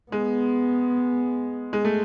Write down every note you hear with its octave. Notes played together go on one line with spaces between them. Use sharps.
G#3 B3
G#3
A3